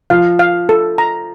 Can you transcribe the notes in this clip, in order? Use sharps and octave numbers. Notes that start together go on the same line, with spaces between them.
F3 F5
F5
A4
A#5